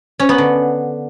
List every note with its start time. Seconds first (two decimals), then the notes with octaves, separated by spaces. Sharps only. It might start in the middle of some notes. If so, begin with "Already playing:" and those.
0.20 C#4
0.29 B3
0.38 D3